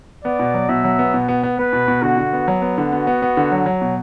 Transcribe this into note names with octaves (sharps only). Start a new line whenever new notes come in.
B3 D5
B2
F#3
B2 E5
F#3
B3
B2
B3
B3
B3 B4
B2
B2
D3 F#4
D3
B3
F#3
B3
D3
B3 F#4
B3
B3
D3
F#3
F#3
B2